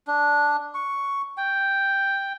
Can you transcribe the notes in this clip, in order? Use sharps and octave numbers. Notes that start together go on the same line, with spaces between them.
D4
C#6
G5